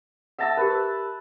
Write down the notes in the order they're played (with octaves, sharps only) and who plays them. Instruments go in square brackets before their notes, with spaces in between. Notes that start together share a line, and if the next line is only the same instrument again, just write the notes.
[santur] E5 A5 E6 [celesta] F#5 A#6
[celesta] G4 A#4 [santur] B4